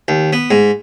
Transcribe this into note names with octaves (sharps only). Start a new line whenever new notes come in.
D#2
B3
G#2